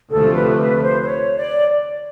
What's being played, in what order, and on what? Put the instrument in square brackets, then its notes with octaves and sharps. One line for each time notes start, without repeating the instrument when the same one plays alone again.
[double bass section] D2 C3 F3 A3 [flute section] A4
[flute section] B4
B4
C5
C5
C#5
D5